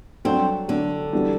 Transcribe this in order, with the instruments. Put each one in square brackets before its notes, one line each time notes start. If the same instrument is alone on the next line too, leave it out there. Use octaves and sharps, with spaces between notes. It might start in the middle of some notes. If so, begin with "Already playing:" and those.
[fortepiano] F#3 A3 D4 [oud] C4
[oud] D3 [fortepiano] F#3 A3 D4
[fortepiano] E3 G3 B3 D4 F#4